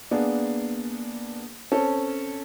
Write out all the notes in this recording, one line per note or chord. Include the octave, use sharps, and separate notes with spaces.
A#3 B3 D4 G#4
C4 C#4 A4